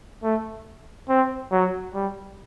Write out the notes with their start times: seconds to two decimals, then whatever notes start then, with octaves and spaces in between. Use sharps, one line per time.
0.23 A3
1.09 C4
1.51 F#3
1.94 G3